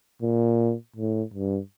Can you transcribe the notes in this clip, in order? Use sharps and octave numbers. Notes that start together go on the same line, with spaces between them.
A#2
A2
G2